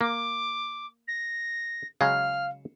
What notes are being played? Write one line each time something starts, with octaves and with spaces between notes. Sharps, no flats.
A#3 D6
A#6
C#3 F#3 G#3 F5 F6